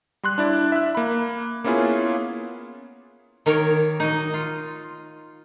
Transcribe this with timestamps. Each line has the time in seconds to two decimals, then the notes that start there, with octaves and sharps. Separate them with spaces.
0.23 G3 C6 F#6
0.38 D4 E4 D5
0.72 E5 F#6
0.95 A#3 B5
1.64 A#3 B3 C#4 E4 F4 G#4
3.46 D#3 A#3 A#4 C#5
4.00 D#4 F#4 D#5
4.34 F4